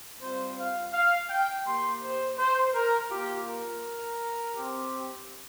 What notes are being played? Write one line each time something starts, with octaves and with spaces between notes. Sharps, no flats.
G3 C4 F4 C5
F5
F5
G5
A#3 G4 C6
C5
C5
A#4
A#3 F4 G4
A#4
C4 G4